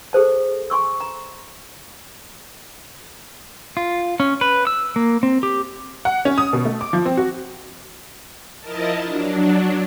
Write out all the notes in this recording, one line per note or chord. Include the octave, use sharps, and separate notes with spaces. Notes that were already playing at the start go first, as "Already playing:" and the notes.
G#4 A4 C5 A5
G#5 C6 C#6 E6
A#5
F4
C#4
B4
E6
A#3
C4
G4
F#5
C#4
D#6
B2
A3
D6
F3
C4
F#4
F3 E4 A#4 D#5 A5
F#3 D4